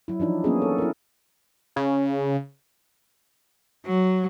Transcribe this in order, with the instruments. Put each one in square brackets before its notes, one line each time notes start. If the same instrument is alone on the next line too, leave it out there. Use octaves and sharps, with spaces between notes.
[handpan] F#3 E4
E3 F3 D4 D#4
F#3 A#3 B3 C#4 F#4 G#4
A4
E4 A#4
[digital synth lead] C#3
[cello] F#3